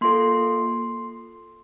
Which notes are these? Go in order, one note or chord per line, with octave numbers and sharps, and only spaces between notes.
A#3 F4 A4 C6